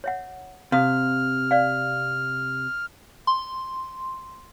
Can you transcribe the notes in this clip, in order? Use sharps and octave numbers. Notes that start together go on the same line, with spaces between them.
C#5 E5 F#5
C3 F5 D#6 F6
D5 F5
C6